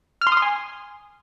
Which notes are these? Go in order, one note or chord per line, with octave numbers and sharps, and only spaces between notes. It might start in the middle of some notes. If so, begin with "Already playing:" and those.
F6
C6
D#6
C6
G#5